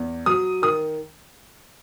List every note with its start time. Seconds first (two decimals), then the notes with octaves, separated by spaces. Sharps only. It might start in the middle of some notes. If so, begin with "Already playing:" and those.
Already playing: E2
0.26 F#3 D#6
0.62 D#3 D#6